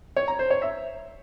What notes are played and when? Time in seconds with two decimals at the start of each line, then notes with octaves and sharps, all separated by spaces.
0.16 C#5
0.28 A#5
0.39 C5
0.50 C#5
0.62 E5